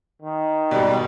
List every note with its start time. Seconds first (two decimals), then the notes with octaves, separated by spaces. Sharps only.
0.22 D#3
0.71 G#2 B2 G3 D5